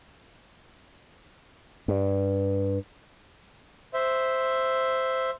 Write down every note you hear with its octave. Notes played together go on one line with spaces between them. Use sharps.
G2
C5 E5